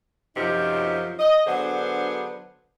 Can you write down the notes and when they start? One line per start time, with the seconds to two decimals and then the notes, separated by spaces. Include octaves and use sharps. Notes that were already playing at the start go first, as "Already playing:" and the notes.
0.36 F#2 C3 F3 C4 D#4
1.19 D#5
1.47 D3 F#3 B3 D4 G#4 C5